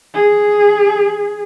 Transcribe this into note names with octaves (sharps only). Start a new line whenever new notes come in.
G#4